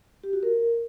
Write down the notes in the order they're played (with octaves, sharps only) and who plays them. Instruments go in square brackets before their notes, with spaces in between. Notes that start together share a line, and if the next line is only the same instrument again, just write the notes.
[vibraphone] G4
F#4
A#4